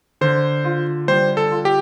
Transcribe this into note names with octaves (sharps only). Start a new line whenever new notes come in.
D3 C5
F4
G3 C5
A4
F4
G4